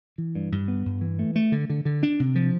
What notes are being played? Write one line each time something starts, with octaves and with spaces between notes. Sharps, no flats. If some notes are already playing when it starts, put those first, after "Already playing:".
E3
G2
G2
B3
G2
E3
A3
A3
D3
D3
D3
D4
C3
F3